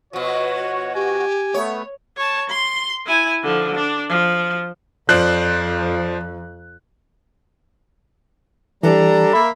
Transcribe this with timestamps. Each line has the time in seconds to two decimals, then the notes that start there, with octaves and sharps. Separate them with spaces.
0.13 B2 F3 F#4 C#5
0.95 G4 G#5
1.54 A3 B3 C#5
2.17 C#5 A5
2.49 C6
3.06 E4 G#5
3.43 D3 F3
3.74 D4
4.09 F3
5.09 F2 F3 C5 D5 F#6
8.83 E3 G3 D4 A4 A#5
9.33 A#3 E5 B5